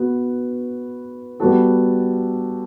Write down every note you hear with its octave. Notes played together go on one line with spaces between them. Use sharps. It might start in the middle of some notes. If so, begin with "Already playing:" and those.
Already playing: B3 F#4 B4
G3 B3 F#4 A4